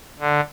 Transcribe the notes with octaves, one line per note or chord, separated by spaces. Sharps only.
D3